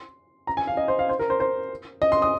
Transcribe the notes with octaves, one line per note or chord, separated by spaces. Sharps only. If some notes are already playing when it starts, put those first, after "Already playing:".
Already playing: C6
A#5
G#5
F5
D#5
C5
F5
C5
A#4
C5
C5
D#5
C6
D#6